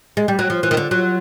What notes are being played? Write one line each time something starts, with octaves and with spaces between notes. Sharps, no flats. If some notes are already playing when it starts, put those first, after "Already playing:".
G#3
G3 G4
F#3 F#4
F3 F4
E3
D#3
D3
F#3 F4